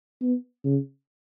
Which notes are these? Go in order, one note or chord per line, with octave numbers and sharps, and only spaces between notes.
B3
C#3